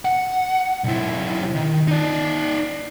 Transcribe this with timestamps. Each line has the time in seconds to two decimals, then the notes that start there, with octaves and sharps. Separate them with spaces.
0.05 F#5
0.84 B1 E4
1.55 D#3
1.88 D#4 D5